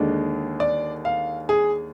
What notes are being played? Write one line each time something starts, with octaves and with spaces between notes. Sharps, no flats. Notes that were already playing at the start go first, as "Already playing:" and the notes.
Already playing: D#2 D3 G#3 D4
D5
F5
G#4